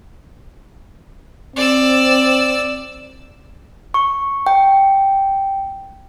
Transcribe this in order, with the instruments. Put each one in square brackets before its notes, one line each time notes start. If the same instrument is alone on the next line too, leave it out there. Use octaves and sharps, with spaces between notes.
[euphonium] C4 [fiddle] D5 E6
[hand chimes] C#6
G5